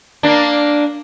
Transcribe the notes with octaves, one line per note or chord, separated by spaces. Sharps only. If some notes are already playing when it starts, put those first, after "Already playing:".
A#3 D4